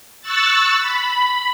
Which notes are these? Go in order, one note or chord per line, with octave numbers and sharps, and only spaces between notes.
C#6 E6 F#6 A6
B5